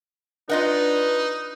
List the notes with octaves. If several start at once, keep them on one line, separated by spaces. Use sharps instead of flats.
D4 D#4 F4 B4 D#5 F#5